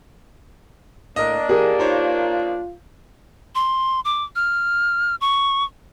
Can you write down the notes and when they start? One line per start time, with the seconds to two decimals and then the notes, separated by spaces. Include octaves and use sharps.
1.16 A2 A#3 D4 A#4 D#5
1.49 E3 G4 G#4 A#4 D#5
1.79 D#4 F4 C5 C#5
3.55 C6
4.05 D6
4.36 F6
5.21 C#6